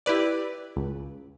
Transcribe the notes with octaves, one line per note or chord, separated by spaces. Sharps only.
E4 G4 B4 D5
C#2